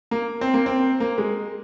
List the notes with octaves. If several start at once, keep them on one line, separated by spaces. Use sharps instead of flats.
A#3
C4
A#3
C4
A#3
G#3